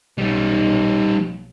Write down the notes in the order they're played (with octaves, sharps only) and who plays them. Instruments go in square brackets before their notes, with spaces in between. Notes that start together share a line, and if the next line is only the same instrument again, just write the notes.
[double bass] B1 [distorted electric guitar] G3 D#4